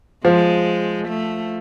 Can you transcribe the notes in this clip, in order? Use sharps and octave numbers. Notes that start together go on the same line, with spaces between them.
F3 G#3
A3